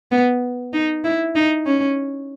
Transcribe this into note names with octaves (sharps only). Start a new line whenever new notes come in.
B3
D#4
E4
D#4
C#4